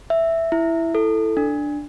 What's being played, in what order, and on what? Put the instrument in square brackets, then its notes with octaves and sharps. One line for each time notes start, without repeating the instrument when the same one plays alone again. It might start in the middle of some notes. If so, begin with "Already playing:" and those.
[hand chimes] E5
E4
A4
D4